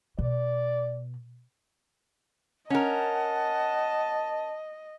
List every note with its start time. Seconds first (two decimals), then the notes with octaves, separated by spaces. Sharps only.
0.19 B2 D5
2.70 C#4 A#4 D#5 F#5 A5